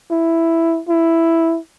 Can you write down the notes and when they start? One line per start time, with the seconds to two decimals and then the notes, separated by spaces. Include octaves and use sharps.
0.11 E4
0.89 E4